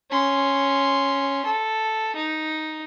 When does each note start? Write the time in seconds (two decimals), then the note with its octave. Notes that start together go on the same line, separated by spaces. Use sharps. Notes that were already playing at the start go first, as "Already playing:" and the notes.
0.11 C#4 C6
1.45 A4
2.16 D#4